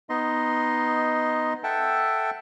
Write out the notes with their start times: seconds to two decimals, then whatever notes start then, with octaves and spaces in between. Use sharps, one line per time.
0.09 B3 D#4 D#5 C6
1.64 A4 E5 F#5 G5 A5